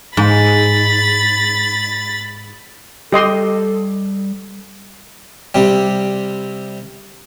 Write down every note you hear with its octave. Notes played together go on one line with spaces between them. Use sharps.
G#2 B5 A6
G3 G4 A4 D#5 C6
C3 G3